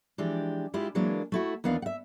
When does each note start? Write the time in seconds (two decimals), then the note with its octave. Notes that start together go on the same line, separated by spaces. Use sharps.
0.18 E3 F3 G#3 D4 G4
0.74 G#3 E4 F4 G4
0.95 E3 F#3 G#3 A#3 D4
1.32 A3 E4 F#4
1.64 D#2 E3 B3 D4 F5
1.82 E5 F#5